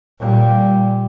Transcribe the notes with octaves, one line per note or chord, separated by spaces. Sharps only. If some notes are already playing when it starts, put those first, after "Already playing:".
A#2 G3